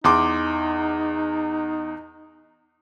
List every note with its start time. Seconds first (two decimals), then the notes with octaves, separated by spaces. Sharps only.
0.04 E2 D#4 C6 D6